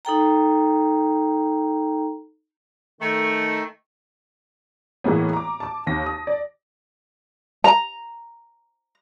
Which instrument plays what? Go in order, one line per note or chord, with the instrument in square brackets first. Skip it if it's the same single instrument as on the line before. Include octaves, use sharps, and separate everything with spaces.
[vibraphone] D#4 A4 G5 A#5
[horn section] D#3 A3
[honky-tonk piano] A2 E3 G#3 A#3 B3
A#5 D6
A5 D6
D#2 A#6
A5 D#6
D5
[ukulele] A#5